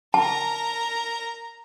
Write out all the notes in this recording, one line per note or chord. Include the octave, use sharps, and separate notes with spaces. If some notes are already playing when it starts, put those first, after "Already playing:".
A#4 A5 A#5